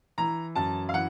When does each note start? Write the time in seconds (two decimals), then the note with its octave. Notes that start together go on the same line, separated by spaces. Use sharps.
0.18 E3 A#5
0.55 F#2 A5
0.89 F5
0.94 E3 F#5